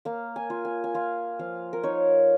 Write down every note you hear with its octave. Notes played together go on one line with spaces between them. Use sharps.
A#3 F5
G#5
F4
G#5
G#5
F4 F5
F3 F5
A#4
D#4 C#5